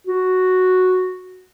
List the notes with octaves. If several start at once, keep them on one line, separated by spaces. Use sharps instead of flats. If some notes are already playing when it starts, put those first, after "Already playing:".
F#4